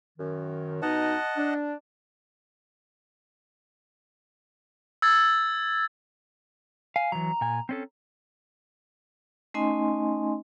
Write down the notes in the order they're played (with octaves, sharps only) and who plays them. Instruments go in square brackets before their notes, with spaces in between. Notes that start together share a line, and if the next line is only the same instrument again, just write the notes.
[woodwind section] F#2 D#3
[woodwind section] B2 D#4 [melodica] D#5 F#5 A5
[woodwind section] D4
[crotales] E6 G#6 A6
[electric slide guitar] F5 [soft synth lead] G#5
[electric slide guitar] E3 F#3 [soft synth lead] A#5
[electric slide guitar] A#2 G#5
C4 C#4 A4
[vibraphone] A3 C#4 D#4 D#5 G#5 C6